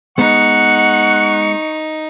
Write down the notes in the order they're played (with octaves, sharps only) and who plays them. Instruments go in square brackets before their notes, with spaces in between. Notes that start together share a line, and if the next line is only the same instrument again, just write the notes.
[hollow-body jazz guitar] G#3 B3 [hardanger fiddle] D#4 [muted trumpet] F#5 [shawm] C#6